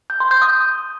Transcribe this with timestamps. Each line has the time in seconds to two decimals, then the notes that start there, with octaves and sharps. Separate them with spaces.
0.10 G6
0.20 C6
0.31 G6
0.42 D#6